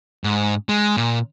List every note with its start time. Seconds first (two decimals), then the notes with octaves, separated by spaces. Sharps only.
0.24 G#2
0.69 G#3
0.97 A#2